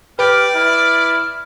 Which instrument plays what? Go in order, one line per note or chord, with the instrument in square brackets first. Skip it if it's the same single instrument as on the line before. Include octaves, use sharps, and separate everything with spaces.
[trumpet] G4 [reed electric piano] B4 [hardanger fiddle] D5 [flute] F6
[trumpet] E4 [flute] F6